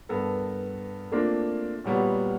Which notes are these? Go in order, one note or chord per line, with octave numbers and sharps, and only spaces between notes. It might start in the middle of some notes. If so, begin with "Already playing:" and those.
G2 B3 A4 A#4
A3 A#3 C4 D4 F4 A#4
A#2 F#3 G3 B3